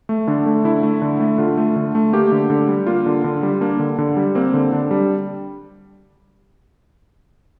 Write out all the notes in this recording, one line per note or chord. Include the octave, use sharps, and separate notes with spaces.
A3
D3 D4
A3
D3 E4
A3
D3
A3
D3 F4
A3
D3
A3
A#3 G4
D3
D3
G3
A#3 F4
D3
D3
G3
A#3 D4
D3
D3
G3
A#3 C4
D3
D3 D4
G3